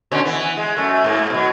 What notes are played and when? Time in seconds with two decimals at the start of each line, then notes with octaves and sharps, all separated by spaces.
0.11 B2 D3 C#4
0.25 E3 B3
0.57 G#3
0.77 F#2 A3
1.04 G#2 A#3
1.30 B2 F#3